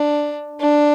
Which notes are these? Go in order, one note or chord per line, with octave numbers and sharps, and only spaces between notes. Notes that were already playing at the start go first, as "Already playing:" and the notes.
Already playing: D4
D4